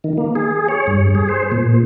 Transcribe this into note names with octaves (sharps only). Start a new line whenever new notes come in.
D#3
A#3
G#4
C#5
G2
G#4
C5
A#2